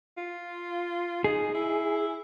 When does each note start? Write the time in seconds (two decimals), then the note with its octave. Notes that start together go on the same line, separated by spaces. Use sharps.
0.18 F4
1.24 D#4 G#4
1.55 E4